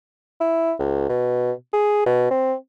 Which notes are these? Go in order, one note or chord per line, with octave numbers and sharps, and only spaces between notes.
E4
C#2
B2
G#4
B2
C4